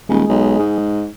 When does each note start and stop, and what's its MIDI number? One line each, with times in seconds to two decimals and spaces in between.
0.09 0.23 27
0.09 0.78 56
0.29 0.58 35
0.59 1.08 44